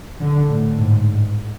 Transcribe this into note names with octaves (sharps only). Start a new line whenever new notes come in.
D3
A2
G#2